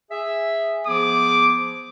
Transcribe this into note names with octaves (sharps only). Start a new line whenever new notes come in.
G#4 E5
F3 B3 G#4 D6